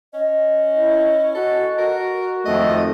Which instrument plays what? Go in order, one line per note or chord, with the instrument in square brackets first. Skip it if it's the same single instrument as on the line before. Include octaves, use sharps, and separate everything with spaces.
[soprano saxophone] C#4 [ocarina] D#5
[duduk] E4
[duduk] F#4 [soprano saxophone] A4
[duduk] F#4 [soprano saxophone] A#4
[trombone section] F2 D#3 A3 [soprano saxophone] D#5